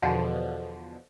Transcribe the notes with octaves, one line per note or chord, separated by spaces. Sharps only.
E2 B2 D3 F3